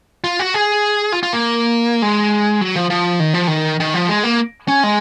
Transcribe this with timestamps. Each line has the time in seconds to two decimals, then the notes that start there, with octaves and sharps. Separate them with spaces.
0.24 F4
0.39 F#4
0.54 G#4
1.12 F4
1.23 F4
1.33 A#3
2.02 G#3
2.61 F#3
2.76 F3
2.90 F3
3.20 D#3
3.34 F3
3.47 D#3
3.80 D#3
3.94 F3
4.09 G#3
4.23 A#3
4.68 C#4
4.84 G#3